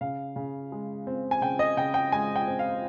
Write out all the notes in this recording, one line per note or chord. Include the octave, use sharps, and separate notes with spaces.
C#3 F5
C#3
G#3
C4
G#5
C#3 G5
D#5
C#3 G5
G5
G#3 G#5
G5
C4
F5